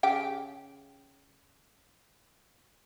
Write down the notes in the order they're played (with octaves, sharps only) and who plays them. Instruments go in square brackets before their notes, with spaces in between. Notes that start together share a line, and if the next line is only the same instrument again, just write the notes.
[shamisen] C#3 G4 G5